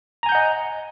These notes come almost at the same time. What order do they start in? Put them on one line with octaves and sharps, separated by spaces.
A#5 G#5 G6 F#5 D#5